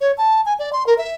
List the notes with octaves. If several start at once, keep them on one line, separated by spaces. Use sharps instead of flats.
C#5
A5
G#5
D5
C6
A#4
E5